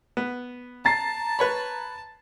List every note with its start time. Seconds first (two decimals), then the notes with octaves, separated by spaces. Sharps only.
0.17 B3
0.85 A5 A#5 A6 C7
1.39 B4 C#5 B5